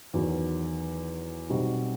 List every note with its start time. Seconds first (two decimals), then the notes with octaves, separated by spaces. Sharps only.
0.14 E2 D#3 F#3
1.50 B1 B2 G3 C4 F#4